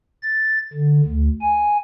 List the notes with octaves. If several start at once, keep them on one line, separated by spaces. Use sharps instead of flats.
A6
D3
D2
G#5